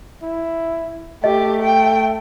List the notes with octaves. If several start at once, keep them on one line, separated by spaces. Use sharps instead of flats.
E4
A3 G4 D#5
G5